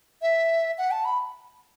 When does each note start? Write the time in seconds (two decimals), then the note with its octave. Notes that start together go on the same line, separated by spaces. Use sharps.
0.22 E5
0.78 F#5
0.91 A5
1.05 B5